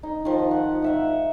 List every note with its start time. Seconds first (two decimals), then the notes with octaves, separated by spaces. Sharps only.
0.03 D#4
0.25 D#3 F3
0.51 F#5
0.82 D#4 E5 F#5